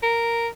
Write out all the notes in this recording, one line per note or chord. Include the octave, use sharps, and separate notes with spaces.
A#4